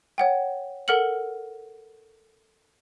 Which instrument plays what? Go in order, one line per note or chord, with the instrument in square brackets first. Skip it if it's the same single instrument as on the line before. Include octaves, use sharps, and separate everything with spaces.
[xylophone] C#5 F#5 G5
A4 A#4 F#5 F6 C#7 F#7